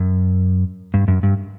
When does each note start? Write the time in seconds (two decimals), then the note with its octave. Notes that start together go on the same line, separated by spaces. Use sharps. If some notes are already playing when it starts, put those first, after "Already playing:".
Already playing: F#2
0.94 G2
1.08 F#2
1.23 G2